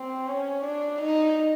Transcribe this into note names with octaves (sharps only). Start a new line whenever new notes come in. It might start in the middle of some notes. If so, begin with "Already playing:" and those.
Already playing: C4
C#4
D4
D#4